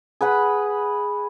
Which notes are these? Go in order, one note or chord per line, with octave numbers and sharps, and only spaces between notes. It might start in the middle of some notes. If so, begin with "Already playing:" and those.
G#4 B4 F#5 B5